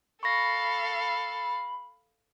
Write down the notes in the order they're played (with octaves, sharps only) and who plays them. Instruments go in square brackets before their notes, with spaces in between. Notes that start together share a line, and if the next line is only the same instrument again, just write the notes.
[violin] A4 F5 [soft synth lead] B5 [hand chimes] C#6 A#6